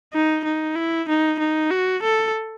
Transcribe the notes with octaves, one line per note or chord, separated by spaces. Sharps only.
D#4
D#4
E4
D#4
D#4
F#4
A4